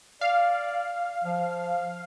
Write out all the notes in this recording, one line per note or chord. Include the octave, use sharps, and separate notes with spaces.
D5 F5
F3